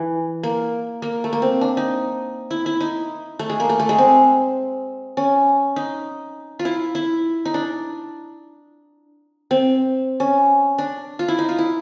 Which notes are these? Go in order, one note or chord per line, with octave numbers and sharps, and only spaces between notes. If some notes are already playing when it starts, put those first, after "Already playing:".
Already playing: E3
A#3
A#3
A3
A#3
C4
D4
D#4
E4
E4
D#4
A3
G#3
A#3
A3
A3
G#3
C4
C#4
D#4
F4
E4
E4
D#4
D4
C4
C#4
D4
F4
E4
D#4
F4
E4